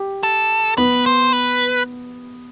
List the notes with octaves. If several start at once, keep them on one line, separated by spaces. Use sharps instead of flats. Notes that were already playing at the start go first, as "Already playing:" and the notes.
Already playing: G4
A4
B3 B4
C5
B4